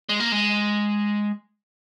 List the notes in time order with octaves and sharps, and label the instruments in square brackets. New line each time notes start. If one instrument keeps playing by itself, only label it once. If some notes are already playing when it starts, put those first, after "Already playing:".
[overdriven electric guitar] G#3
A#3
G#3